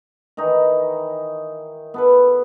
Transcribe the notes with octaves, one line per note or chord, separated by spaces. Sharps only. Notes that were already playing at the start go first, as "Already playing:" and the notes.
D#3 E3 D#4
B3 A4 B4